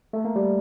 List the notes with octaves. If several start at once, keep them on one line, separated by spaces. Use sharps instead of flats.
A3
A#3
G3